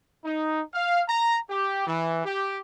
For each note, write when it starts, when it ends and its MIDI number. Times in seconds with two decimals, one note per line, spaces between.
0.25 0.61 63
0.74 1.03 77
1.09 1.37 82
1.50 1.85 67
1.87 2.22 52
2.25 2.58 67